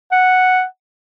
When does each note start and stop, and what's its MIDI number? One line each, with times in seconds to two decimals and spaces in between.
0.12 0.64 78